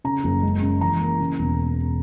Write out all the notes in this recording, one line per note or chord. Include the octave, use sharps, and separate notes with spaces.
C#3 A#5
F#1
G#3
C#3
E3 A#5
A#3
C#3
E1